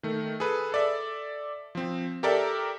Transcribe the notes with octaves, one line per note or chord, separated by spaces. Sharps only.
D#3 A3
G#4 A4 B4
A4 D5 E5
F3 C4
G4 A4 A#4 D5 E5